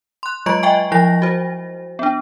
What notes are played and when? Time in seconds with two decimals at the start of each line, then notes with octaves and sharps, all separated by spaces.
0.23 C6 F#6
0.46 F#3 G#3 F4 D#5 C#6 D7
0.63 D#5 E5 G5 G#5 C#6
0.92 F3 E4 A#6
1.22 F#4 C5
1.99 B3 D4